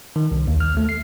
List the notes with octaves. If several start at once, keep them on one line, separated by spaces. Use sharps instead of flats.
D#3
C2
D#2
F6
A3
C7